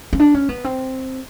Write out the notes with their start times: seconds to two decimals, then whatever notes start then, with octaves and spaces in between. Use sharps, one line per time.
0.13 C#4
0.20 D4
0.34 C#4
0.49 B3
0.64 C4